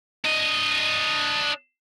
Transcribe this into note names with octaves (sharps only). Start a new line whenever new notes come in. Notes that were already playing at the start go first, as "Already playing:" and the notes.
D4 D#5